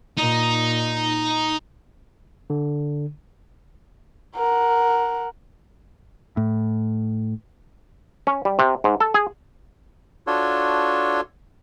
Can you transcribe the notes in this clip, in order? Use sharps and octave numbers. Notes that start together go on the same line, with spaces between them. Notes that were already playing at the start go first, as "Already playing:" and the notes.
A#2 D#4
D3
A#4 F#5
A2
C#4
G3
C3
G#2
A4
G#4
D4 F4 F#4 A4 C#5